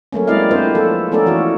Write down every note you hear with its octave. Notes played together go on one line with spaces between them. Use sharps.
F#3 A3 A#3 C#4
G#3 C4 E4 D5 D#5 F5
C4 D4 E4 F4 B4 C5
F3 F4 A4
A3 B3 C#4 D#4 A4 D5
E3 F4 F#4